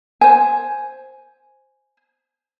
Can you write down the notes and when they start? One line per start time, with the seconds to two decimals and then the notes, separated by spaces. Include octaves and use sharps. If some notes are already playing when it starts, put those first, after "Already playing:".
0.21 C5 G#5